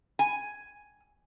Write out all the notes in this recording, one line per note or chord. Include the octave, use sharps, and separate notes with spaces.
G#5